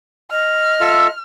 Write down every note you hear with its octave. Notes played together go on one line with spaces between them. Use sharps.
D#5 F6
F4 A4 E5